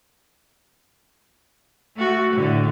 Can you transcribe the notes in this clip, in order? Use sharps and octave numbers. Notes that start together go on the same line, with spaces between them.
A3 F#4
A2 D3